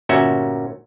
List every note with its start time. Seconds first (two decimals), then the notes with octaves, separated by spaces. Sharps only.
0.09 G1 A#2 C#4 F#4 E5